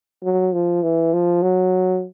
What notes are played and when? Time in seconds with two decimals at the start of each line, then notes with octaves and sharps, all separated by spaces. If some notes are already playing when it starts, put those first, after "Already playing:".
0.24 F#3
0.53 F3
0.83 E3
1.13 F3
1.43 F#3